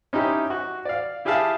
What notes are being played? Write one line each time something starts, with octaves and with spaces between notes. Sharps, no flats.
C#4 D#4 E4 G4
F#4
D5 F5
E4 G4 G#4 E5 F5 A5